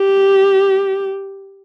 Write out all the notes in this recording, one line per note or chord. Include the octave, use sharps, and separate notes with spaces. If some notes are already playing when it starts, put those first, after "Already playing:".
Already playing: G4